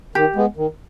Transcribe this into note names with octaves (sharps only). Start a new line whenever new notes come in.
D#3 G4
G#3 B3
D#3